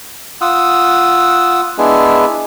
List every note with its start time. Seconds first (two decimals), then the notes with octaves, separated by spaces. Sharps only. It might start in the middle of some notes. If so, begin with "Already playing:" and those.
0.41 F4 F#5 D#6 E6
1.78 G#3 B3 D4 E4 G#4